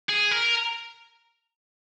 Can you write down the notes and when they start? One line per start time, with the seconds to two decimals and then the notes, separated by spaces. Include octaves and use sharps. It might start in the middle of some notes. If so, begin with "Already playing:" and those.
0.09 G#4
0.31 A#4